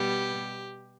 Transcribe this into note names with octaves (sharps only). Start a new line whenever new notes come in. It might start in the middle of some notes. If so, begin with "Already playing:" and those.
Already playing: B2 G3 B3 G4